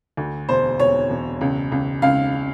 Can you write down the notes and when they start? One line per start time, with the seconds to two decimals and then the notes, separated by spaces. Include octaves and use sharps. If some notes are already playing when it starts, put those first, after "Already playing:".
0.17 D2
0.49 E1 C5
0.79 E1 C#5
1.10 E1
1.41 C#2
1.72 C#2
2.02 C#2 F5